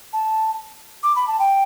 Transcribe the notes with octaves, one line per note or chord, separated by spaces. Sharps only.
A5
D6
B5
A5
G5